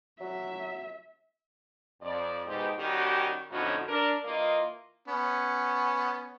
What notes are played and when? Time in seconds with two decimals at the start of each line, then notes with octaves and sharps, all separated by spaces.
0.20 F#3 E5
2.01 F2 D5
2.46 G#2 B2 G4
2.77 D#3 G3 C#4 F#4 G4
3.50 F2 A2 D3 C#4 D#4 F#4
3.87 D4 A#4
4.24 E3 A#3 F4 D#5
5.08 B3 C#4